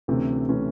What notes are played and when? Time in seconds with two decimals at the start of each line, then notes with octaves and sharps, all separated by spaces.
0.08 D2 C3 E3 A3 C#4
0.49 C3 E3 A3 C#4